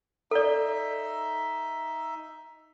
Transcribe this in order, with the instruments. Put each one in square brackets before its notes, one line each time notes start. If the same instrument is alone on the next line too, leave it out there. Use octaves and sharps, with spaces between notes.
[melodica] D#4 E5 [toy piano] A4 D5